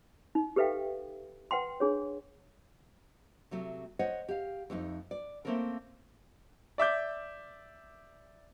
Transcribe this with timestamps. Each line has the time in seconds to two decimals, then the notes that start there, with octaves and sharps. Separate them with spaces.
0.35 D#4
0.56 G4 A4 B4 E5 F5 G5
1.51 B4 F#5 G5 C6
1.80 D4 G#4 C#5
3.51 C3 F#3 A3
3.99 C5 C#5 D#5 F#5
4.29 G4 F5
4.70 F2 A3 B3 D#4
5.11 D5
5.45 A3 A#3 C4 C#4 A4 A#4
6.78 D5 E5 D6 G6